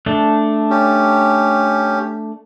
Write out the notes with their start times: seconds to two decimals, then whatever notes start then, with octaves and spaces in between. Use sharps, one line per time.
0.06 A3 D4
0.70 C#4 G4